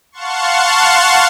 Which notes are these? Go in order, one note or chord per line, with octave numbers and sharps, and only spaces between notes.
F5 F#5 A5 C6 C#6